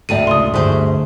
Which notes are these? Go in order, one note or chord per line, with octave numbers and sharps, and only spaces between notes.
D1 A#1 F2 A2 D5 E5 A5 D#7
C#2 C6 D#6
D2 G2 A3 G#4 C5